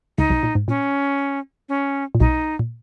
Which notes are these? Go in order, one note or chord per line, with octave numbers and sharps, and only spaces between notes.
C#2 C#3 D#4
B1 B2
A#2
G#2
A#2 C#4
C#4
A#2
B1 B2 D#4
A#2